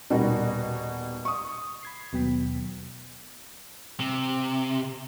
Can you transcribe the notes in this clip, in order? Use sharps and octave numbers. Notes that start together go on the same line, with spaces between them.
D#1 B2 G3 D#4 F#4 A#4
C#6 D#6
B5 G#6 C7
D#2 B2 F#3 B3 G5 B6
C3